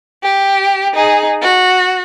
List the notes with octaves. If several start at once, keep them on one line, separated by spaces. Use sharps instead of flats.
G4
D#4 G#4
F#4